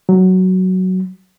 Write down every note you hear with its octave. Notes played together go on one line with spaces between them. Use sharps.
F#3